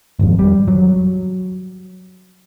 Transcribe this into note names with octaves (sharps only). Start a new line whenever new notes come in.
G#1 F2
G3
F#3